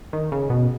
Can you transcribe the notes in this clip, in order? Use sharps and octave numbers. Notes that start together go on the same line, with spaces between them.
D#3
C#3
B2